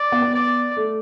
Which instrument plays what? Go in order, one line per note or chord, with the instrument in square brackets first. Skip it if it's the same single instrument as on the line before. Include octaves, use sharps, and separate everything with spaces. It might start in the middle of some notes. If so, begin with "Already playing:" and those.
Already playing: [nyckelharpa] D5
[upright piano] B3
B3
[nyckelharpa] D5
[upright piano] A3